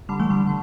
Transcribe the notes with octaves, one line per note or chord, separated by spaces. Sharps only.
D3 G3
E3 A3
D3 G3
D3